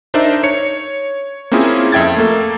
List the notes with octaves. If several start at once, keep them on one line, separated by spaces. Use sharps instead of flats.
D4 D#4 A#4 C5 D5 E5
C#5 C#7
A#3 C4 C#4 E4 F4 G#4
F2 E5 G5 G#6 A6
A3 A#3 A4